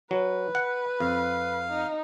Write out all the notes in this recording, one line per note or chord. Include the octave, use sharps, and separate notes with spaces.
F#3 B4
F#5
F2 F5
D#4